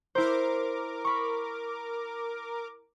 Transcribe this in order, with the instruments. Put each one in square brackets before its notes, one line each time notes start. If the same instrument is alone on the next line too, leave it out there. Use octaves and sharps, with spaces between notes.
[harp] E4 C5 [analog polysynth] A#4 D6
[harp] B5 C#6